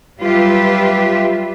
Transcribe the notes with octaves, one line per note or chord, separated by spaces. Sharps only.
F#3 G3 F4 G4 B4 E5